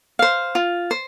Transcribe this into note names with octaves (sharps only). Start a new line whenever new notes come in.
C5 F5
F4
C5